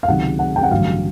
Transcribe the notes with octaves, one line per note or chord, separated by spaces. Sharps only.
F5
C#2 C3 D#3 F#3 F#5
F#5
G5
F#5
A1 G2 D3 F#3 F5